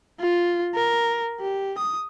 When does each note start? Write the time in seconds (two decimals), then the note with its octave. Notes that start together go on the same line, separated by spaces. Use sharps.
0.20 F4
0.75 A#4
1.41 G4
1.78 D#6